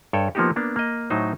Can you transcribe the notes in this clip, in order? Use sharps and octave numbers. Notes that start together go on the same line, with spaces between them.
G2 A4 C#5 G5
F3 A#3 B3 D#4 F#4 G4
A#3 B3 D4
A#3 D#5
A2 F#3 D#4 C5